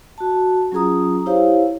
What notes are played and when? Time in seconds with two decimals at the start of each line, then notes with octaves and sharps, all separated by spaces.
0.18 F#4 A5
0.72 F#3 C#4 F4 G#4 A#5 D#6
1.26 E4 G4 C5 C#5 F5